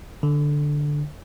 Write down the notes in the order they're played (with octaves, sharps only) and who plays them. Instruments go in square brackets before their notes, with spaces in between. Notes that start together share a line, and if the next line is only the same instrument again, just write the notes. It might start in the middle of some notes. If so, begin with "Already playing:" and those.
[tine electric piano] D3